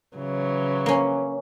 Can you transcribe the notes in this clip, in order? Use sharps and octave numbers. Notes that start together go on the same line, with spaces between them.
C#3 E3 F#3
A#3 C#4